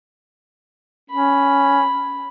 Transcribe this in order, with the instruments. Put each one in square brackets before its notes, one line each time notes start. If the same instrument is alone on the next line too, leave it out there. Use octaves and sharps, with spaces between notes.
[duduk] C#4 [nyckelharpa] B5